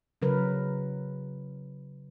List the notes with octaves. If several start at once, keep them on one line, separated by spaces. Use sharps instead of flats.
C#3 F#3 A#4 B4